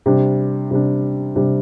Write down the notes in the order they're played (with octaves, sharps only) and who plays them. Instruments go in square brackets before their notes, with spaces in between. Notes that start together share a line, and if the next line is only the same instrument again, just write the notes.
[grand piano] C3 G3 D4
C3 G3 D4
C3 G3 D4